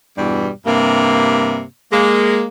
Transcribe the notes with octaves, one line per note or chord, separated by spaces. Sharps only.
E2 G2 B2 E3 G3
G2 C3 A#3
G#3 A#3